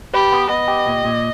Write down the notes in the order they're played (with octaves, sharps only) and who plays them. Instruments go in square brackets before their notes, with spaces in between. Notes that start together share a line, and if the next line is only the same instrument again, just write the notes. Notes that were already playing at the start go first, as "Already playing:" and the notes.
[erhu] G4 [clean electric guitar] B4
[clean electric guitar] B3
[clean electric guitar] B3 [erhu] D#5
[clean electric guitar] G4
A#2
A#2